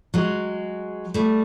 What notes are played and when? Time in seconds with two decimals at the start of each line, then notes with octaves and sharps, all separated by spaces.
0.14 F#3 G#3
1.14 G3 A3